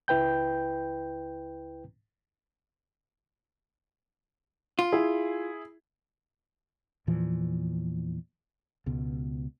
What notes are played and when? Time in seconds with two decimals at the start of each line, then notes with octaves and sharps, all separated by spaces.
0.08 C#2 E4 B4 G5 G6
4.79 F4
4.92 E4 G#4
7.07 E2 A#2 E3 F3
8.86 C#2 B2